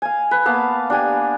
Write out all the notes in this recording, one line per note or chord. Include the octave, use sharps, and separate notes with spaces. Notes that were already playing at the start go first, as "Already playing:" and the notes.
F5 G#5
B4
A#3 B3 F5 A5
D4 G4 G#5